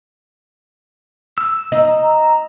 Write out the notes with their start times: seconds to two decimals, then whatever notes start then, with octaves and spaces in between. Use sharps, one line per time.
1.38 E6
1.72 D#4
2.03 A#5